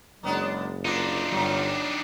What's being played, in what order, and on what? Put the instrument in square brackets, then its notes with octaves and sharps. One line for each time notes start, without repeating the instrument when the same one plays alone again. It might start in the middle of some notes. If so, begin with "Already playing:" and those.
[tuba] F#1 [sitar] F#3 B3 D4 [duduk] G#3
[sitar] A#3 B3 [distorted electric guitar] D4 D#4 [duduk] F4
[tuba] G1 [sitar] F#3 G3